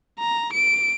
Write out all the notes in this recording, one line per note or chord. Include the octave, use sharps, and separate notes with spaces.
A#5
D7